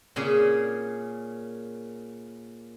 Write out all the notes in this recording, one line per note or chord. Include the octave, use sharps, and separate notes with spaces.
A#2 C#3 G#4